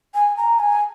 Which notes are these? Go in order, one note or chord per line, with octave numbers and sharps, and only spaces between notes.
G#5
A#5
G#5